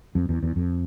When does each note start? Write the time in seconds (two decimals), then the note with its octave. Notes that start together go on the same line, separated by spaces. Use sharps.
0.15 F2
0.29 E2
0.43 E2
0.56 F2